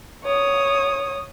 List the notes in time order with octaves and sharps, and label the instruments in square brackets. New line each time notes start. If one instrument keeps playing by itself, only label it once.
[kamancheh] C#5 D#6